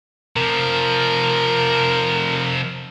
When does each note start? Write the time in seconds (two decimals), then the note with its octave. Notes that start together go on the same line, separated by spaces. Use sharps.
0.36 C3 F3 A#4